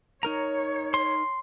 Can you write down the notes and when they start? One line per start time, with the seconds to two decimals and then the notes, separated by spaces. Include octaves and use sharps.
0.23 D#4 A#4 C#5 A#5
0.94 C6